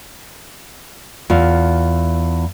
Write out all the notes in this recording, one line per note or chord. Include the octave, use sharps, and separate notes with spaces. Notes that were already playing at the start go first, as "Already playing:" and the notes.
E2 F4